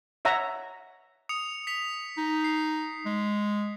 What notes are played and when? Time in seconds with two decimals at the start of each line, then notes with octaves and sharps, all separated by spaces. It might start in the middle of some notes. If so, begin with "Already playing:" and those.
0.25 C#5 E5 F#5 A#5
1.29 D#6 C#7 F7
1.67 B6 F7
2.17 D#4
2.44 C7
3.06 G#3